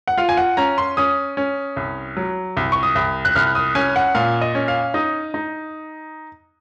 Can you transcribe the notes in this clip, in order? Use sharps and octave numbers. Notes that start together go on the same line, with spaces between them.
F#5
F4 F5
G#5
F#5
C#4 A#5
C6
C#4 D#6
C#4
C2
F#3
C2
C#6
D#6
C2
F#6
C2 F6
D#6
C#4 G#5
F#5
A#2 F5
D#5
C#4
F5
D#4 D#6
D#4